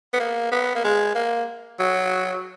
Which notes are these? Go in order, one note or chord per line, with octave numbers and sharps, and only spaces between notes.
B3
A#3
B3
A#3
G#3
A#3
F#3